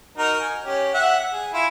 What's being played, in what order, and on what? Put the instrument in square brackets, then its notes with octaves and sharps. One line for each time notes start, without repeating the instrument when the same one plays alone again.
[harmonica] D#4 F#4 A#4
G#5
C#4 G4
E5 F#5
G#4
E4 F4 G#5